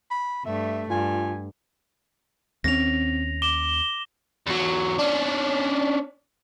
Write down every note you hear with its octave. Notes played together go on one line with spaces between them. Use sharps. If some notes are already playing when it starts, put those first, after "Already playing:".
B5
G2 A3 E5
G2 F4 G#5
D#2 A3 C4 C#4 A#6 F7
D6 E7 G7
E2 F#3
C#4 D4